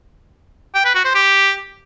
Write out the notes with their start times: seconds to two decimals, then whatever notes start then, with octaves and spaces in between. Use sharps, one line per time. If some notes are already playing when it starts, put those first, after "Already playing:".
0.75 G5
0.85 B4
0.95 F#4
1.05 C5
1.15 G4